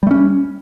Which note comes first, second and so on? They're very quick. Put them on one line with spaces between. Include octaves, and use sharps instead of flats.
G3 A3 C#4